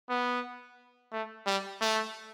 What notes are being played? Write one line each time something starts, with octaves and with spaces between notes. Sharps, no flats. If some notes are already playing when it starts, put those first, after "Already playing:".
B3
A3
G3
A3